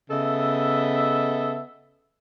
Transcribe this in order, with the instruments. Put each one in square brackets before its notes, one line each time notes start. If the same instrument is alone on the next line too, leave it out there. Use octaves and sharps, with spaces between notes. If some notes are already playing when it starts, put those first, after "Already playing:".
[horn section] C#3 B3 A4 D#5 E5